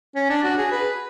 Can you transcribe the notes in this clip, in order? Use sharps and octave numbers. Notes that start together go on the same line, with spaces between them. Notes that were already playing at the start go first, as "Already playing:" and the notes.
C#4
D4
F#4
G#4
B4